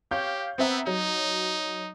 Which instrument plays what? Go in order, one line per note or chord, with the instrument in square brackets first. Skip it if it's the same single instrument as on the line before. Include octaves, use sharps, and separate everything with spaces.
[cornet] G4 [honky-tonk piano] C#5 F5 G6
[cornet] B3 [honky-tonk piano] C4 E5 A#5
[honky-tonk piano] F#3 [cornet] D#4